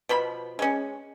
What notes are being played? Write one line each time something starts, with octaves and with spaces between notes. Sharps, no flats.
B2 F3 B5
G#3 C#4